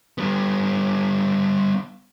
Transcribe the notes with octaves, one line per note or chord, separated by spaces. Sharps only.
G3 B3